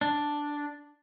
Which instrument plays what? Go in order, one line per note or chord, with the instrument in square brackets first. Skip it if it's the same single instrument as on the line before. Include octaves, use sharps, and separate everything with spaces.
[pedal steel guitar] D4